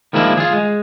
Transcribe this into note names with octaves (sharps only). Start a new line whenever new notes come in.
D#3 F3 G#3 A#3 D4 E4
F4 G#4
G#3